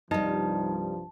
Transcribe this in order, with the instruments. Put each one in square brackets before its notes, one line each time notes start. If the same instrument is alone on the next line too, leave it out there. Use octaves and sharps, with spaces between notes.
[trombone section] C2 G2 F3 [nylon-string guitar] G3 D#5 [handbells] D#4 [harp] A5